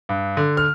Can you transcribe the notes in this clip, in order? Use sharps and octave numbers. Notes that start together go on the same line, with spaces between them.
G2
D3
F6